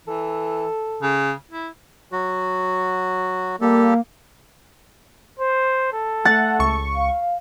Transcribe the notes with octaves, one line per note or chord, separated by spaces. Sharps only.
E3 A4
C#3
E4
F#3 F#4
G3 A#3 G4 A4
C5
A4
A3 F#5 A6
C#2 C#6
F5